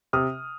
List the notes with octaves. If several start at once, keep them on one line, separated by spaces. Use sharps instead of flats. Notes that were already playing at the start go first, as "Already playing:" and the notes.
C3 D#6 F6